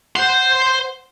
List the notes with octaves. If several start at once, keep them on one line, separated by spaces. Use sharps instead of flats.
C5 F#5 C6